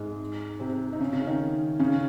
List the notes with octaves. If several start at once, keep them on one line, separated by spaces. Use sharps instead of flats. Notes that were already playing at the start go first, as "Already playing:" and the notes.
Already playing: G#2 G#3
C3 C4
D#4
C#3 C#4
C#3 C#4
D#3 D#4
C#3 C#4